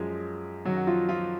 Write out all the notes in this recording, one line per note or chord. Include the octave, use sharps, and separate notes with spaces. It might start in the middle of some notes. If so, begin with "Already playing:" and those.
Already playing: F#2 F3 G#3 G#4
F#2 D#3 F#3 F#4
F#4
F3 F4
F3 F4